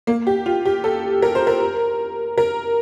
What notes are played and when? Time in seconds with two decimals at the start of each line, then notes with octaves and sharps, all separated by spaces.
0.07 A#3
0.27 G4
0.46 F4
0.66 G4
0.84 A4
1.22 A#4
1.35 C5
1.47 A#4
2.38 A#4